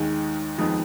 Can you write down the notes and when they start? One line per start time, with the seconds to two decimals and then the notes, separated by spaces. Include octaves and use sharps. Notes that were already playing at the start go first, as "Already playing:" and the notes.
Already playing: D#2 D#3 G#3 D#4
0.58 F2 D#3 G#3 B3 D#4